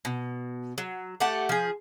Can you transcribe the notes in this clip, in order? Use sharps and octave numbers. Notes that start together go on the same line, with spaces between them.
B2
F#3
A3 G4 F#5 A5
F3 G#4